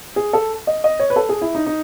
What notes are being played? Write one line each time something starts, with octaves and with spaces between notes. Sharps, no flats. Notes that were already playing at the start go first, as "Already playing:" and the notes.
G#4
A4
D#5
D#5
C#5
B4
A4
G#4
E4
D#4
D#4